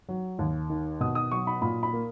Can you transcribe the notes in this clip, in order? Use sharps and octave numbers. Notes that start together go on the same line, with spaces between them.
F#3
D#2
D#3
B2 D#6
D#6
F#3 C#6
B5
A#2 B5
B5
A#3